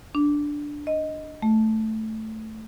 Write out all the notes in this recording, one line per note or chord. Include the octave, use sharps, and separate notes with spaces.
D4
D#5
A3